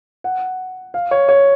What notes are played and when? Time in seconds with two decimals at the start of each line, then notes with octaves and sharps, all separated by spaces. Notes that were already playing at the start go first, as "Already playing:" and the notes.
0.24 F#5
0.94 F5
1.11 C#5
1.29 C#5